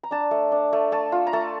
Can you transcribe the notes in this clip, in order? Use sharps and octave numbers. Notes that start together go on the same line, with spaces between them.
A#5
D4 A5
A3
D4
A3
A3 A5
F4
A#5
A3 A5